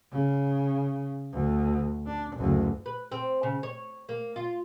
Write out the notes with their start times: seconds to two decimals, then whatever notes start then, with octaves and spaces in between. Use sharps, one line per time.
0.12 C#3
1.32 D2
2.06 D4
2.36 F#1 D2
2.86 B4
3.12 C4
3.43 C#3
3.63 C#5
4.09 A#3
4.36 F4